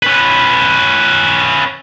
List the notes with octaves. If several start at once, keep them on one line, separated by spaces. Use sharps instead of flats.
C#4 B4